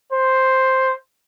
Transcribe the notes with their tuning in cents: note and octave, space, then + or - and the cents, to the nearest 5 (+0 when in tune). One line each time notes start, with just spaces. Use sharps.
C5 +5